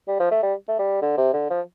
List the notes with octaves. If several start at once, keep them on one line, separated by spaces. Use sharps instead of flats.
G3
F3
A3
G3
A3
G3
D3
C3
D3
F3